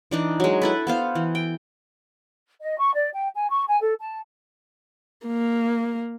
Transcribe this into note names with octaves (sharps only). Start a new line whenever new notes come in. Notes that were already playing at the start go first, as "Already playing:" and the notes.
E3 D4 D#4
F#3 G#3
E4 A4 B4
B3 C5 F5
E3
G5
D#5
C#6
D5
G5
G#5
C#6
G#5
A4
A5
A#3